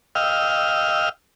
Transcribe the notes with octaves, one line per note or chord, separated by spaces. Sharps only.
D#5 F5 G5 E6 F6